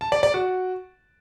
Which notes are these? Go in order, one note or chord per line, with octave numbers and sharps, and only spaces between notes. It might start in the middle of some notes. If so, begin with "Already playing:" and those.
A5
D5
D5
F#4